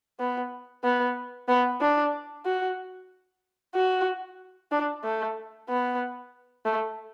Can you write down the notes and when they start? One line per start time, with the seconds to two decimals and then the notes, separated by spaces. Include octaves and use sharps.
0.19 B3
0.84 B3
1.49 B3
1.81 D4
2.45 F#4
3.75 F#4
4.72 D4
5.04 A3
5.69 B3
6.65 A3